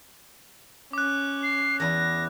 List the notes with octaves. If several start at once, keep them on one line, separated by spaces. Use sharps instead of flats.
C#4 D6 F#6
C7
E2 E3 B4 A#6